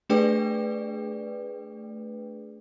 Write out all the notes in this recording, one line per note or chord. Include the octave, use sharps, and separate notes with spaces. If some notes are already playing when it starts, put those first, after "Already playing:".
A3 D4 G#4 B4 D5 G5